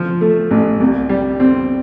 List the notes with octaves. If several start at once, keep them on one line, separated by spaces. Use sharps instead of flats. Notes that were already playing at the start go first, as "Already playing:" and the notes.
Already playing: F3
A3
A1
C2
G3
C4